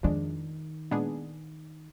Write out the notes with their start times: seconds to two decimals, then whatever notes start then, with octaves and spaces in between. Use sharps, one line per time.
0.03 F2 D#3 F3 G#3 D4
0.91 A#2 G#3 B3 D4 G#4